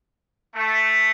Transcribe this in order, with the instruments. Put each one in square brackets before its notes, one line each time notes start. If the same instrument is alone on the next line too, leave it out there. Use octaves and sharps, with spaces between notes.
[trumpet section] A3